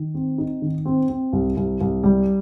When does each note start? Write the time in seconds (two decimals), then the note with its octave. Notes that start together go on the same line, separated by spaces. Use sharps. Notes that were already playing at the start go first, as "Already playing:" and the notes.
Already playing: D#3
0.14 C4
0.38 D#4
0.62 D#3
0.85 C4
1.09 C4
1.33 C2
1.57 C2
1.81 C2
2.04 G3